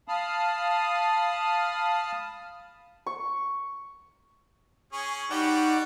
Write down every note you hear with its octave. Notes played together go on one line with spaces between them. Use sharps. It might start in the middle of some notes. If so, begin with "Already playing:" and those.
F5 A5 B5 D#6 F6
C#6
C#4 G#4 C#6
G3 D#4 F#4 G4 D5 F#5